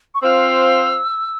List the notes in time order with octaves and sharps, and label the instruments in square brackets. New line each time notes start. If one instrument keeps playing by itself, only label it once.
[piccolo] C#6
[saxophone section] C4 F4 C5 F5 [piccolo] E6